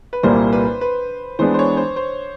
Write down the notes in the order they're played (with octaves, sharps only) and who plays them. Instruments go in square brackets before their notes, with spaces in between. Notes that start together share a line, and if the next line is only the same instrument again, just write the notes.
[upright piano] B4
[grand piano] C2 A#2 G3 A#3 [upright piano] C5
[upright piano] B4
B4
[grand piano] E3 G#3 B3 D4 [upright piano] C5
[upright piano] C5
C#5
C5
C5